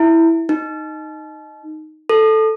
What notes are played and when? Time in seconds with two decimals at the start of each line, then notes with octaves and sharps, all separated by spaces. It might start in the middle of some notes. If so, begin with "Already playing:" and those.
Already playing: E4
0.49 D#4
2.09 A4